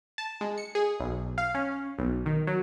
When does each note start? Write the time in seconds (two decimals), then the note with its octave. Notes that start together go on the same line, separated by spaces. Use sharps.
0.18 A5
0.41 G#3
0.58 C#7
0.75 G#4
1.00 B1
1.38 F5
1.55 C#4
1.98 B1
2.26 D#3
2.47 F#3